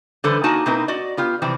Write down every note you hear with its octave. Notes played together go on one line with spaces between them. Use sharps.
D3 E3 G3 A4 B4 C5
A#3 D4 D#4 F#4 G#5 A5
B2 A#3 C4 D#4 E4 B4
F#4 D5 D#5
B3 F4 G4
C3 E3 F3 C4